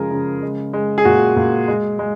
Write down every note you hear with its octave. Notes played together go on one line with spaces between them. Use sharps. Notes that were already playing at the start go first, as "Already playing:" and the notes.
Already playing: C#3 F3 G#3 G#4 A#4
C#3
G#3
G#3
G#4
A#2 F#4
A#2
G#3
G#3